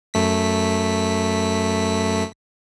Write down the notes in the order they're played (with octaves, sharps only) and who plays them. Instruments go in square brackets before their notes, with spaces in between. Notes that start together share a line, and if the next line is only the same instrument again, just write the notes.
[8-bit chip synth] F#2 A3 B6